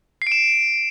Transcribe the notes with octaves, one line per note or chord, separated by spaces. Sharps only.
C7
D7
E7